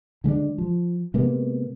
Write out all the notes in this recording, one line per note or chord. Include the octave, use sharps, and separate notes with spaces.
D3 G#3 A3 D4
F3
C3 G#3 A#3 B3